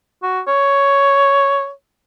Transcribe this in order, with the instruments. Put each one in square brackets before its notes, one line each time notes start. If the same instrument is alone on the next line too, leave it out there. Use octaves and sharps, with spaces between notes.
[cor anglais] F#4
C#5